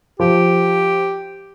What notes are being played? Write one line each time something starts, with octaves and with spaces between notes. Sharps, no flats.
F3 G4